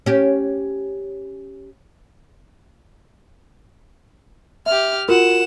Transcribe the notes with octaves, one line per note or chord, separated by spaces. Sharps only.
C#4 G4
G4 E5 F6
F4 F#4 A#4 F#5 E7